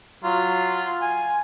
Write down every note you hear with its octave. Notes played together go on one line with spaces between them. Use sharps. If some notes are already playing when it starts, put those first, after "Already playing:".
F#3 F4
G#5